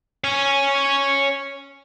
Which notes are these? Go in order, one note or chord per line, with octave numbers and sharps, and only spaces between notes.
C#5 G#5